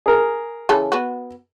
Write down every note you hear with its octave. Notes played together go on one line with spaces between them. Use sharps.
G#4 A#4
C#3 E3 A4
B3 F#4